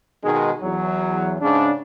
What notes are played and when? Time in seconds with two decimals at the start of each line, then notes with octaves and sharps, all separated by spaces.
0.23 B2 D#3 G#3
0.61 E2 F#3
1.41 G#2 C#3 D4